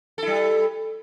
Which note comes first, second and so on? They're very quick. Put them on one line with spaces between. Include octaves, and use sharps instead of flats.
A4 E4 G3